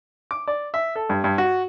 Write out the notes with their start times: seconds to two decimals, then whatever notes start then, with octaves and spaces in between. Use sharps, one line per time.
0.31 D6
0.48 D5
0.74 E5
0.96 A4
1.09 G2
1.24 G2
1.38 F#4